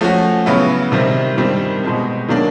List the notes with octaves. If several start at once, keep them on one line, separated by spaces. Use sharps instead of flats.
F3 A3 C#4 F#4
C#3 F#3 B3 E4
C3 D#3 G3 C4
G2 D#3 G3 C4
B2 G#3 C4
D#3 F#3 A#3 D4